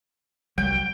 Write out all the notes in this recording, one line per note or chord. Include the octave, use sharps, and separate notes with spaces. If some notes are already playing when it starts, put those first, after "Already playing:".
C2 F#3 G3 G5